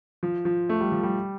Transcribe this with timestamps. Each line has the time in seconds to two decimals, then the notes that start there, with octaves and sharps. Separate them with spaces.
0.23 F3
0.45 F3
0.69 A3
0.80 G3
0.92 F3
1.03 G3